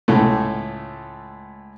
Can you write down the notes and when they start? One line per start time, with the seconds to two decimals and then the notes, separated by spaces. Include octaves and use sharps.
0.08 C#2 A2 A3